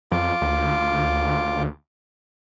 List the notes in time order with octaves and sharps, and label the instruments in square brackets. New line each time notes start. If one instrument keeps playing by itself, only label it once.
[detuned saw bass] F2 [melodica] F4 D6
[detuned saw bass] D2